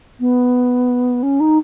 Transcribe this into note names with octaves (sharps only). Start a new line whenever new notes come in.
B3
C#4
D#4